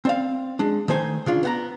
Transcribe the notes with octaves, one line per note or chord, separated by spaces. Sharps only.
C4 D5 F5
G#3 D4
D#3 A3 C5 G#5
C#3 D4 F4
B3 F#5 A#5